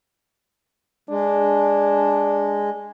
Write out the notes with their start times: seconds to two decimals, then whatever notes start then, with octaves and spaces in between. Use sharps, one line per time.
1.10 G#3 D4